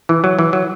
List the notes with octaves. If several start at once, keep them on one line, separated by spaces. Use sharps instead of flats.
E3
F#3
E3
F#3